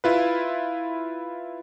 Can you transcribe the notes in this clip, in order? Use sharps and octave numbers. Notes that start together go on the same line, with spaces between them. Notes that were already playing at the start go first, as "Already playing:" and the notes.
E4 F4 B4